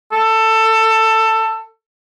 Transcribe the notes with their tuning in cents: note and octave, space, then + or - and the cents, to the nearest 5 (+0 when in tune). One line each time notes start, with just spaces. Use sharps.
A4 +15